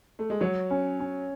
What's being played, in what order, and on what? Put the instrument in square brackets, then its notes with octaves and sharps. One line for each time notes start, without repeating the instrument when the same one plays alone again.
[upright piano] A3
G#3
[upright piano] F#3 [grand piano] C#5
[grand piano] C#4
C#4